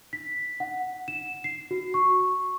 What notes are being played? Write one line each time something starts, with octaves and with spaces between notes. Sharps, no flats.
B6
F#5
E7
C7
F#4
C#6